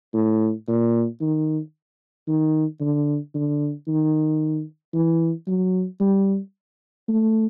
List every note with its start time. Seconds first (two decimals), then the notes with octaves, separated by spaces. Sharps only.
0.14 A2
0.68 A#2
1.21 D#3
2.28 D#3
2.80 D3
3.34 D3
3.88 D#3
4.94 E3
5.47 F#3
6.00 G3
7.08 A3